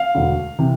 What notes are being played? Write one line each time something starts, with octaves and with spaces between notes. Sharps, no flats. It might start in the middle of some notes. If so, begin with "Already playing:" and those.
Already playing: F5
E1 D2 D3
C3 E3